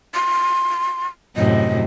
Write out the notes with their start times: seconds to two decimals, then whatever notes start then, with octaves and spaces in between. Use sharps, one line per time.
0.14 C6
1.36 F#2 A2 C3 D#5